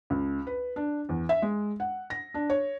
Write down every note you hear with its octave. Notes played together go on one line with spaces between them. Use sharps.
C#2
B4
D4
E2
E5
G#3
F#5
A#6
D4
C#5